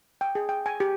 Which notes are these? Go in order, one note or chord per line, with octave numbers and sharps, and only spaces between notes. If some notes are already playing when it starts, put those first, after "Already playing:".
G5
G#4
G5
G#5
G4